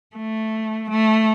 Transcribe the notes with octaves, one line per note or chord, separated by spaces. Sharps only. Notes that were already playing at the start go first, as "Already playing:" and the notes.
A3
A3